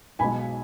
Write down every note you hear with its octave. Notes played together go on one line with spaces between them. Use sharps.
B1 B2 G#3 G#5 B5